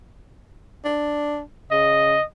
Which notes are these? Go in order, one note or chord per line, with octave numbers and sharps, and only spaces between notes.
D4
C#3 D#5